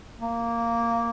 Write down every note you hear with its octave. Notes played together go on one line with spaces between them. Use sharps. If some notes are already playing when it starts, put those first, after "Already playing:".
A#3